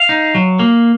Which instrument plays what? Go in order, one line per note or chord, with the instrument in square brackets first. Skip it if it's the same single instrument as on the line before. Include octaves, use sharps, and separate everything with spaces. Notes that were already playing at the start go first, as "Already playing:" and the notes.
Already playing: [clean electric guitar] F5
D#4
F#3
A#3